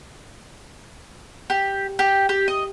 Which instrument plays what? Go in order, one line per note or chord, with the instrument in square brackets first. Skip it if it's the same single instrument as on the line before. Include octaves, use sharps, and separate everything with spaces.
[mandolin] G4
G4
G4
D#5